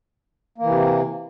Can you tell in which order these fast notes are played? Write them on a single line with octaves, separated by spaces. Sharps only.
A#3 E3 C3